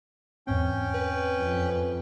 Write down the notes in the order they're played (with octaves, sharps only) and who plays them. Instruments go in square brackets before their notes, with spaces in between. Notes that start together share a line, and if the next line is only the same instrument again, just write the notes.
[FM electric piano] E2 G#2 C4 [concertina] C#4 G5
[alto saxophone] B4
[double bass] F2